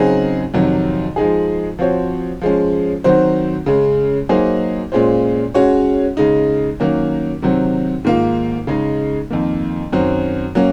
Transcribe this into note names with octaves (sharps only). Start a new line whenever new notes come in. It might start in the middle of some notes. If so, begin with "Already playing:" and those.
Already playing: C#3 F#3 C4 D#4 G#4
F2 C3 D#3 F#3
F3 G#3 D#4 G#4
F3 C4 F#4 C#5
F3 G#3 C#4
D#3 F#3 C4 F#4 C5
C#3 G#3 C#4
F#3 A#3 D#4 G#4 C5
A#2 G#3 C#4 F4 C5
G#3 C#4 F#4 C#5
C#3 G#3 D#4
D#3 F#3 A#3 C#4
C3 D#3 F#3 C4
G#2 D#3 A#3 F4
C#3 G#3 D#4
F2 D#3 A#3
F#2 D#3 F#3 C4
F#3 A#3 C#4